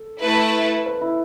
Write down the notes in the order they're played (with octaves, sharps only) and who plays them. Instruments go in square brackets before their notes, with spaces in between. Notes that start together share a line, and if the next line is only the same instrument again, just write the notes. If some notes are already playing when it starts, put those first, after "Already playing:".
Already playing: [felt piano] A4
[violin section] A3 E4 B4
[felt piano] B4
E4